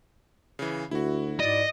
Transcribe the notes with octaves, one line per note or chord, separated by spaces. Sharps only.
C#3 E3
D2 E4 F#4
G#2 D5 D#5